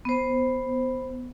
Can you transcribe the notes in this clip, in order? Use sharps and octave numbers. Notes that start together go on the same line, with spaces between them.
B3 C5